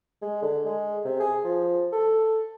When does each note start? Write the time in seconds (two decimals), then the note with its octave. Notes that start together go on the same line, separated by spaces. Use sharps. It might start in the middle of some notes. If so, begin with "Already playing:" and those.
0.22 G#3
0.42 D3
0.65 G#3
1.05 C3
1.20 G#4
1.44 F3
1.92 A4